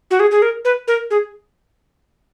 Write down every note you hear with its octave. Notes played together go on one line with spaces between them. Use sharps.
F#4
G#4
G#4
A#4
B4
A#4
G#4